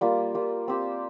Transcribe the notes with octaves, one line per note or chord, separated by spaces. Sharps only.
G3 A#3 F4
G3 A#3 F4
C4 G4 C5